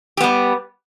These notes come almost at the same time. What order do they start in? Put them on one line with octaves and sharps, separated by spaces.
G4 B3 G3